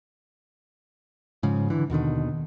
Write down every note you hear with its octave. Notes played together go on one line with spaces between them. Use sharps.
G#2 C#3 F3
D3 E3
D#2 B2 D3 D#3